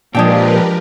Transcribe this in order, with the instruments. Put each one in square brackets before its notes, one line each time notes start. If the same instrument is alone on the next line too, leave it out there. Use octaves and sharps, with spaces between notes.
[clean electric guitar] A#2 [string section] F3 [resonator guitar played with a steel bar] G#3 D4 G5 [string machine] G4 A#4 B4